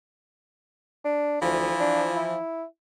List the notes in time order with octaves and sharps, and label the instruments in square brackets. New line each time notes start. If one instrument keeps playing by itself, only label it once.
[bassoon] D4
[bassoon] D2 [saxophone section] E3 F3
[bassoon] D4
E4